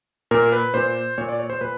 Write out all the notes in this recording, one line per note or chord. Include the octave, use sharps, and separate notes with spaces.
A#2 A#4
B4
A#2 C5
A#2 C#5
D5
C#5
C5
A#2 B4